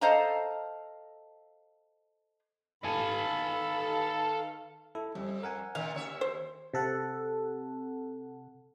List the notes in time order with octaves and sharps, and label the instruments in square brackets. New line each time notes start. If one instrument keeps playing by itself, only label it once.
[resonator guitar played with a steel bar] A4 C5 D#5 F5 A5 A#5
[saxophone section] D#3 B4 F5 [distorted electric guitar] A4 G#5 [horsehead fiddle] B5
[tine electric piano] E4 A4
[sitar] F2 [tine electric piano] G3
[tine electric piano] A#4 F#5 G#5
[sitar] A#2 D#3 [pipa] F5
[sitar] D#2 C#5 E5
[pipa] C5
[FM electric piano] C3 A4 F#5